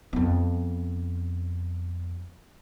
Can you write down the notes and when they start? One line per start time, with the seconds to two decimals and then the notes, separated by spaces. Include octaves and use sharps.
0.13 F2 B3